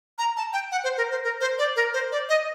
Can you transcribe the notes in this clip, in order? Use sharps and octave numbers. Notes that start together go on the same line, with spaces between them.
A#5
A5
G5
F#5
C5
A#4
C5
A#4
C5
D5
A#4
C5
D5
D#5